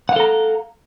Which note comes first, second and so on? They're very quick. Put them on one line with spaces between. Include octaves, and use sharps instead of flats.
F#5 F5 A4 A#5